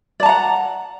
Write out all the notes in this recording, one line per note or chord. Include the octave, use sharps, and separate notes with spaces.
D5 F#5 A5 A#5